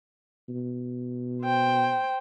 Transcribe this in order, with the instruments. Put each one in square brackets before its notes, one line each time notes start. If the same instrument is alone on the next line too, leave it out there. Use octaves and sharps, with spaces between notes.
[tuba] B2
[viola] C5 G5